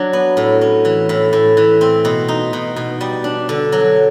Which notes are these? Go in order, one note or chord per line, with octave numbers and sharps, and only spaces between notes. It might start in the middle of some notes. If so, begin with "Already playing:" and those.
Already playing: F#3 D4
B3
A2
C#4
E3
A2
A2
E3
C4
B2
D#4
B2
B2
G3
D4
D3
F#3